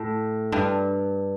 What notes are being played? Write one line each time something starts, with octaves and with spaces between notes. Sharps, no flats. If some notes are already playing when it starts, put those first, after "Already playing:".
Already playing: A2
G2